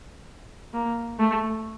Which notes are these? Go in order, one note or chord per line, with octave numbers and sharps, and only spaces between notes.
A#3
A3